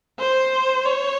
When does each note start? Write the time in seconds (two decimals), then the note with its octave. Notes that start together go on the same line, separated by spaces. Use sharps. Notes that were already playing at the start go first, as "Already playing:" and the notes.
0.19 C5
0.85 C#5